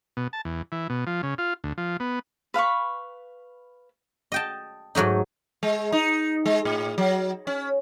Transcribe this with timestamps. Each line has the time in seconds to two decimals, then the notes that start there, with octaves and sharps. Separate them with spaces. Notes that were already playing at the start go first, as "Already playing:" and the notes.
0.17 B2
0.33 A5
0.45 E2
0.72 E3
0.90 B2
1.07 F3
1.23 C#3
1.38 F4
1.64 D2
1.78 F3
2.00 B3
2.54 B4 F5 B5 C#6
4.32 D#5 G5 A5
4.95 G#2 F#3 A3 D#4
5.63 G#3
5.92 D#4
6.46 G#3
6.65 A2
6.98 F#3
7.47 C#4